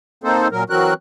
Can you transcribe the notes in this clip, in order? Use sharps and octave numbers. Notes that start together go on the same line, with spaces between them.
A#3 C4 D#4 A4 C5
A#2 F#3 A#4
E3 F#3 C4 F#4 A#4 F#6